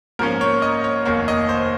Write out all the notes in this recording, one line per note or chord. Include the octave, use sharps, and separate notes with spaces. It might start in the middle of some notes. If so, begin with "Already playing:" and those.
G#2 F3 A#3 C#4 A#4
C#5
D#5
C#5
F1 D#2 D#3 A#3 C#5
D#5
C5